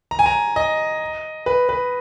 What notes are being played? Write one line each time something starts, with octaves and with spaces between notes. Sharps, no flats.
A#5
G#5
A#5
D#5
B4
B4